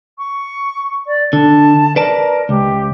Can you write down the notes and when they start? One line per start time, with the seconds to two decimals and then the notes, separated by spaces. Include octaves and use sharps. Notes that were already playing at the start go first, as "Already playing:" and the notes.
0.18 C#6
1.07 D5
1.33 D3 A5
1.96 A#4 B4 D5 A5
2.49 C#2 G4